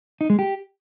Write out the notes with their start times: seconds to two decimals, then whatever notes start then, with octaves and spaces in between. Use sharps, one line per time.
0.21 D#4
0.30 G#3
0.39 G4